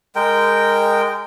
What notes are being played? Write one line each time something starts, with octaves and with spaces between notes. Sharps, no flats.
G#3 A#4 G5